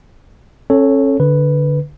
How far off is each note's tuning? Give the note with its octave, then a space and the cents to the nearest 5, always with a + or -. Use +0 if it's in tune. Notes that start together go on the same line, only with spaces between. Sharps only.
C#4 -35 A4 +0 C#5 +0
D3 -10 B4 +0